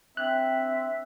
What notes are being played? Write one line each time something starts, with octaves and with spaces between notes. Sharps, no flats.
C4 D4 E5 G5 F#6